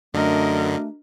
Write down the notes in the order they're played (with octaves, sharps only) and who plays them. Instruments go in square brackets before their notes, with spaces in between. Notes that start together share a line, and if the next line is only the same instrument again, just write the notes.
[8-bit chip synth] F#2 D3 [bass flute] A3 [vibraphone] D4 F#4 [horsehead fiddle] A#4 D#5